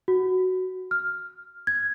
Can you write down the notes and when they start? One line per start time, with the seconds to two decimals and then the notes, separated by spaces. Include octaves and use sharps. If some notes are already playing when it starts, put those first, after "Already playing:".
0.08 F#4
0.91 F6
1.67 G#6